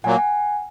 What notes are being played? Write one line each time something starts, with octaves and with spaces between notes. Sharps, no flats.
A#2 F#3 A#3 F#5 G#5
F#5 G#5